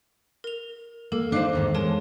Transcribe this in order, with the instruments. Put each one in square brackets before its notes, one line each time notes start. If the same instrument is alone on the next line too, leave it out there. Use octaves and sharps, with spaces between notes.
[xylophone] A#4 F7
[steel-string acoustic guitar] A#3 [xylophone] A4
[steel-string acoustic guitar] D4 D#4 C5 [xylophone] F5 D6 F#6
[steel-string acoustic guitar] E2 G#2 D#3
[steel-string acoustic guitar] G#3 [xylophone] A#4 C#5 A5